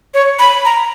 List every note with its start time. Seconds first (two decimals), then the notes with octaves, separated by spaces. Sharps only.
0.14 C#5
0.39 B5
0.65 A#5